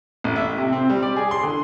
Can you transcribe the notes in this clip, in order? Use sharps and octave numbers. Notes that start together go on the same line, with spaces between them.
A1
E5
C3
C4
G3
D5
G#4
C6
D3